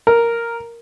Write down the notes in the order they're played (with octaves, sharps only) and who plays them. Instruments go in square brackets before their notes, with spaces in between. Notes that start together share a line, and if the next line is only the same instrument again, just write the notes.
[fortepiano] A#4